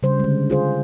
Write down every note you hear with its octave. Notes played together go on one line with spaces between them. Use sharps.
C#3 G3 C5
D3 G#3
F4 G#4 C5